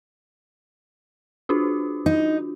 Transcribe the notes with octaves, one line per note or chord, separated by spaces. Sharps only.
D4 F4 F#4
D#4